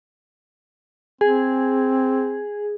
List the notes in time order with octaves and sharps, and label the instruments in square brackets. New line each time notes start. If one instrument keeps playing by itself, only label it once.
[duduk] C4 [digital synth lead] G#4